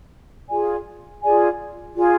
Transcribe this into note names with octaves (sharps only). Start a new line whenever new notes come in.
F4 G#4 D5 G#5
F4 G#4 D5 G#5
F4 G#4 D5 G#5